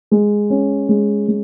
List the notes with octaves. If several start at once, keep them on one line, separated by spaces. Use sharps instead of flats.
G#3
C#4
G#3
G#3